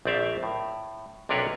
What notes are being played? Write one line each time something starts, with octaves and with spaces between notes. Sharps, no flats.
A#1 A3 C4 D5 E5 F5
A2
B1 C3 D4 A#4 B4 C#5